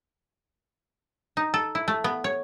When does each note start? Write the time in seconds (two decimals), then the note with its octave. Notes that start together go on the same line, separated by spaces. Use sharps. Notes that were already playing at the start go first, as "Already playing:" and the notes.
1.37 D#4
1.54 A4
1.75 E4
1.88 A3
2.04 B3
2.24 C#5